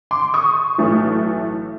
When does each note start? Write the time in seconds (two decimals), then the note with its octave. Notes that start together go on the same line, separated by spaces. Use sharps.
0.11 C6 D6
0.34 C#6 D#6
0.78 B1 A2 E3 A3